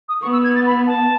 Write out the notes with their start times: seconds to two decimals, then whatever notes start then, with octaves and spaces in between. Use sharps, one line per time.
0.09 D#6
0.22 B3 C#6
0.33 E6
0.44 G#6
0.55 A6
0.66 B5
0.87 A5